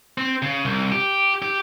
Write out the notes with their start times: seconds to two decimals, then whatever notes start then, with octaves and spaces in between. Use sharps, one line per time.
0.18 C4
0.42 C#3
0.65 C2
0.92 G4
1.42 G4